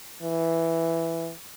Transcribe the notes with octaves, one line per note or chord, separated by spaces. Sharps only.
E3